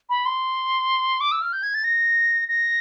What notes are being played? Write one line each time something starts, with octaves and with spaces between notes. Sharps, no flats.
B5
C6
D6
E6
F6
G6
G#6
A6
A#6
A#6